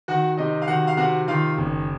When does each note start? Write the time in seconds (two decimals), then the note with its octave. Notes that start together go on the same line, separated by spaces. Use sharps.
0.08 D#3 F#4 F#5
0.37 C3 D#4 D#5
0.62 F5
0.67 D#3 F#4 F#5
0.87 F5
0.97 C3 F#4 F#5
1.28 D#3 F4 F5
1.58 F#1